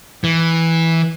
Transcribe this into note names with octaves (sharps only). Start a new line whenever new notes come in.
E3